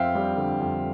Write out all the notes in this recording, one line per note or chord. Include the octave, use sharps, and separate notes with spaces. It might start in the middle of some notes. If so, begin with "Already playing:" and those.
Already playing: F2 C4 E5 F5 G5
G3
D3
F2